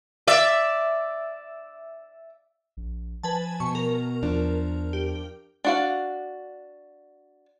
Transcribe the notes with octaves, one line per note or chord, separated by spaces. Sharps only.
D5 E5
A#1
F3 B4 G#5 A5
B2 C#6
A#4
E2 F3 D4
G4
D4 F#4 F5